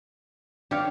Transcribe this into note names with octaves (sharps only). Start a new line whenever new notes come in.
D4 G4 C#5 F5